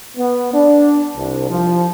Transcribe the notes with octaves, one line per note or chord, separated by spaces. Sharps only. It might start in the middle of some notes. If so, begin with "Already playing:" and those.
B3
D4
C2
F3